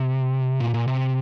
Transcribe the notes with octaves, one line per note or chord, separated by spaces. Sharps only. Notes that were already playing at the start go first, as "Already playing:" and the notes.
Already playing: C3
A#2
A#2
C3